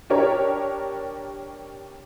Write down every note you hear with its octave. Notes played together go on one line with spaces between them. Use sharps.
D4 G4 A#4 C#5